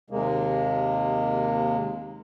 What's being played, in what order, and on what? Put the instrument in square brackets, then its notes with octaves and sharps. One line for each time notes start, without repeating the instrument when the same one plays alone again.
[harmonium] D#2 C3 G#3 A#3